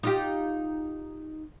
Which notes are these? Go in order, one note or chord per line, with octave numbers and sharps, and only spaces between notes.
D#4 F4 G4